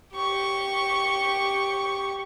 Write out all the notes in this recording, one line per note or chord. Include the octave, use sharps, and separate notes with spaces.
G4 C#6